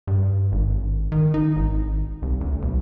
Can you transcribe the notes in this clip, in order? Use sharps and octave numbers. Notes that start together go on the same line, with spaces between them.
G2
G#1
D#3
D#4
G#1
C2
D2
B1